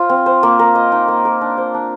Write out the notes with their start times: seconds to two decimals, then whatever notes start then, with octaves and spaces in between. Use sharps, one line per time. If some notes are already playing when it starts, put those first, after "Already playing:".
Already playing: F4 C5
0.09 C4
0.26 C5
0.43 A#3
0.59 A#4
0.75 D#5
0.92 D#4
1.08 A#3
1.25 A#4
1.41 D4
1.57 C5
1.74 D4